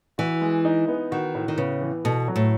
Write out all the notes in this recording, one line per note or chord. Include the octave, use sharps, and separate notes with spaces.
E3 F#4
G#3
D#4
B3
D#3 F#4
A2
D#3
C#3 B3
E3
B2 A4
F#3
A2